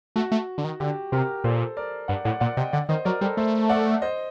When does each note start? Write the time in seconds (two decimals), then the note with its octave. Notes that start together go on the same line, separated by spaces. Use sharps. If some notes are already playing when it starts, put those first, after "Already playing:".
0.16 A3 F#4
0.32 A3
0.58 D3
0.64 D#3
0.80 D3 G4
1.12 C3 G4 A#4
1.44 A#2 A4 C5
1.77 A#4 D5
2.08 G2 D5 F#5
2.24 A2 D5 F#5
2.40 A#2 D5 F#5
2.57 C3 D#5 G5
2.73 D3 D5 F#5
2.89 D#3 C5 D#5
3.05 F#3 A#4 D5
3.21 G3 A4 C5
3.37 A3 A4 C5
3.69 D5 F#5
4.02 C5 D#5